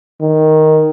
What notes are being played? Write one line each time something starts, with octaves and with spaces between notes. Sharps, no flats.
D#3